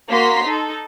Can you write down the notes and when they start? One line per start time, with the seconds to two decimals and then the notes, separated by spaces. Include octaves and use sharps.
0.11 A#3 F#4 A#5 C6 B6 C7
0.45 D#4 A4